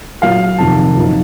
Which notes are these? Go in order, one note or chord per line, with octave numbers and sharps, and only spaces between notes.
A#2 F#3 A#3 F5
F2 C3 D#3 A5
F#2 F3 A#3 D#4